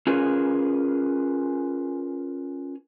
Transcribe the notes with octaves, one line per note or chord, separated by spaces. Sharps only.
C#4 F4 G#4 A#4 B4